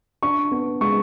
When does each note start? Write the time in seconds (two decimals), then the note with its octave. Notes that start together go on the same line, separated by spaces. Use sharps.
0.23 D4 C#6
0.51 B3
0.81 G#3 C#6